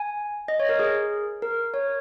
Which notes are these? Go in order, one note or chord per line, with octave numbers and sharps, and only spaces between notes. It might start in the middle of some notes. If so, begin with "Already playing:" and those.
Already playing: G#5
D#5
C#5
A#4
G#4
A#4
C#5